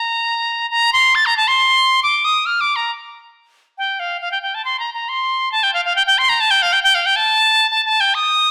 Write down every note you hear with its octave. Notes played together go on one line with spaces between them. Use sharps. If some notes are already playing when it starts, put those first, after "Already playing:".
Already playing: A#5
A#5
C6
A6
A#5
A5
C6
D6
D#6
F6
D6
A#5
G5
F5
F5
G5
G5
A5
C6
A#5
A#5
C6
A5
G5
F5
F5
G5
G5
C6
A#5
A5
G5
F5
G5
G5
F5
G5
A5
A5
A5
G5
D#6